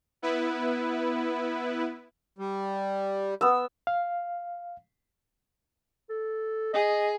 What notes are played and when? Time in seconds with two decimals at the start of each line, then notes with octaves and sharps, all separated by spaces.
0.22 B3 E4 B4
2.38 G3
3.41 B3 E6
3.87 F5
6.10 A4
6.74 G#4 D#5